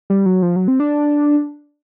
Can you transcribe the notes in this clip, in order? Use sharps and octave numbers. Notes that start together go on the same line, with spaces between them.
G3
F#3
F3
F#3
C4
D4